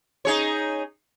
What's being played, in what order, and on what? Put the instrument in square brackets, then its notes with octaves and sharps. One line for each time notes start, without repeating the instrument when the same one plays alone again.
[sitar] D#4 G#4 C#5